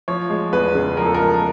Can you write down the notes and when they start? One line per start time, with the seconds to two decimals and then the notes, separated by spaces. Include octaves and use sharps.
0.08 F3 C#5
0.30 G#3
0.53 E2 B4
0.75 C#3
0.97 F3 A#4
1.05 A4
1.14 A#4
1.19 G#3